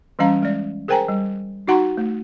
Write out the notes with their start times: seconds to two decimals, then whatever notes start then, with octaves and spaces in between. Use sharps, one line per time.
0.19 E3 G3 C#4 F5 A#5
0.43 G#3 D5
0.88 G#4 A#4 C5 G5 G#5 A#5
1.08 G3
1.67 D#4 F#4 F#5 A#5 C6 C#6
1.97 A3